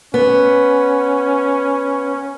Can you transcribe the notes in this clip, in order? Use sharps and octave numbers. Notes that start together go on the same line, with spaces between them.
B3 C#4